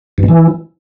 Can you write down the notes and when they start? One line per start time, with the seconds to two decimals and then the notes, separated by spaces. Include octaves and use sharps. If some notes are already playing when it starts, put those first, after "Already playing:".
0.18 G2
0.23 B2
0.28 E3